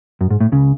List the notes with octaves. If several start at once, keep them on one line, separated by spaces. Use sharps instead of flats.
F#2
G#2
A2
C#2 C#3